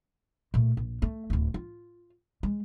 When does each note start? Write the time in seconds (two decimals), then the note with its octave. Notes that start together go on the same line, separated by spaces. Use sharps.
0.54 A#2 A3
0.77 A#1
1.02 A3
1.30 D1 A3
1.54 F4
2.43 G#3